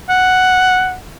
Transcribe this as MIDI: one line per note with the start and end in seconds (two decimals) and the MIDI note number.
0.10 0.95 78